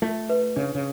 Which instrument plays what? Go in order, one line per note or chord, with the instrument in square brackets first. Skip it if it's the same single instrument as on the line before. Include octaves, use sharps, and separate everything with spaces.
[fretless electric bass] A3 [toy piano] F4
[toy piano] B4
[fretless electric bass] C#3 [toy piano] D4
[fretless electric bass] C#3